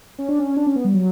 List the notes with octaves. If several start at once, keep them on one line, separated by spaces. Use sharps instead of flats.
C#4
D4
C#4
D4
C#4
B3
G3
F#3